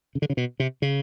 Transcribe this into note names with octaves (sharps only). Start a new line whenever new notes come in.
C#3
D3
C#3
B2
C3
C#3